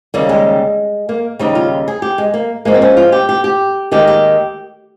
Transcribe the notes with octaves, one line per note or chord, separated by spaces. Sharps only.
D#2 C#3 G3 A#3
G#3
A#3
D#2 C#3 G3 D#4
F4
G#4
G4
G#3
A#3
G#2 F3 G#3 A#3
C4
C#4
F4
G4
G4
G4
D#2 D#3 G#3 G4
G4